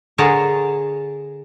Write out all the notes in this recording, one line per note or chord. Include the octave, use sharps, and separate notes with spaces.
D3 G#4 A#4 C#5 A5